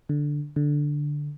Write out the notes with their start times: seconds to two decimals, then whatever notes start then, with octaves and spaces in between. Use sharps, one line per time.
0.09 D3
0.56 D3